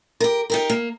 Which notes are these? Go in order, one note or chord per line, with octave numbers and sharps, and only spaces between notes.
G4 A#4
D#4 G4 A#4
A#3